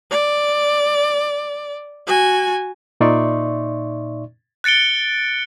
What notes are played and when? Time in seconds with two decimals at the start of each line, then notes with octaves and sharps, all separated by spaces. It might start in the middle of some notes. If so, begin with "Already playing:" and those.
0.11 D5
2.07 F#4 G#5
3.01 A#2 D#4 D5 E5 C6 C#6
4.64 F#6 A6 C#7 D7 G7